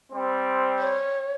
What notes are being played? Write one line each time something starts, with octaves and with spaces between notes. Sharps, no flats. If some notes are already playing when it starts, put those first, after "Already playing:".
G3 C4
C#5